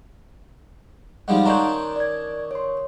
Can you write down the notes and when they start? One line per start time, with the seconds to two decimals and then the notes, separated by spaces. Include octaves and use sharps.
1.28 F3 G3 G#3 D#4 F5 F#5
1.46 D#3 C#4 D4 A#5 C6 G6
1.96 D5 G#6
2.51 C#5 C6